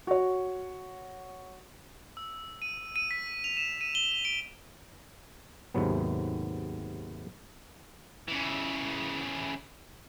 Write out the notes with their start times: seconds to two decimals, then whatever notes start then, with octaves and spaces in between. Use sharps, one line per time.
0.07 F#4 C#5
2.17 E6
2.62 D#7
2.96 D#7
3.11 B6
3.44 F7
3.57 E7
3.81 D#7
3.95 G7
4.25 D7
5.74 D#2 G#2 C3 F#3 B3
8.28 C#3 E3